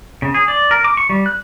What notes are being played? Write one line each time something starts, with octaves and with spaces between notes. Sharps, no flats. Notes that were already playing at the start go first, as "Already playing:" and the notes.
C#3
G#4
D5
A#4
D6
C#6
G3
F#6